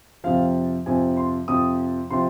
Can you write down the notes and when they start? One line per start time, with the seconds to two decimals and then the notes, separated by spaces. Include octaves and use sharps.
0.24 F2 C3 F3 F5
0.86 F2 C3 F3 G#5
1.17 C6
1.48 F2 C3 F3 D#6
2.11 C3 F3 C6